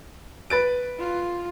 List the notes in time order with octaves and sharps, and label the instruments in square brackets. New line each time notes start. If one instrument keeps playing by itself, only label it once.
[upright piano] B4 A6 D7
[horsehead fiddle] F4